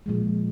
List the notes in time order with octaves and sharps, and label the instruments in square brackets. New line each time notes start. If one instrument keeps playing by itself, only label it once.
[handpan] A#2 F3 G#3